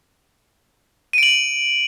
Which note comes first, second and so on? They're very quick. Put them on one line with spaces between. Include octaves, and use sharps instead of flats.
D#7 D7 F#7